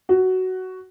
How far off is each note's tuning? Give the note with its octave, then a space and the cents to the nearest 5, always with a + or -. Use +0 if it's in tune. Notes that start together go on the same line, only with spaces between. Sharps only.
F#4 +10